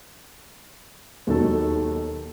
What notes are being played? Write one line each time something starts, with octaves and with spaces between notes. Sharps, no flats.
D#2 B2 D#3 F#3 A4